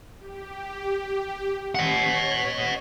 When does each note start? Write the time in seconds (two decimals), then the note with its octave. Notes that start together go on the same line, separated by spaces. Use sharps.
0.19 G4
1.75 C#5 D#5 F#5